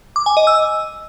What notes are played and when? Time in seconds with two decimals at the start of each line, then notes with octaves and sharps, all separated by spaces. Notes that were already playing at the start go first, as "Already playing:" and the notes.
0.16 D6
0.26 G#5
0.37 D#5
0.47 E6